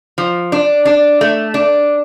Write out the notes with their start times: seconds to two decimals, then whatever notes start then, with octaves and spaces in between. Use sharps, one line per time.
0.18 F3
0.52 D4
0.85 D4
1.21 A3
1.54 D4